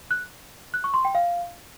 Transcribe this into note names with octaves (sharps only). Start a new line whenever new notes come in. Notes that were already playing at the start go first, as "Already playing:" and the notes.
F#6
F#6
C#6
C6
G5
F5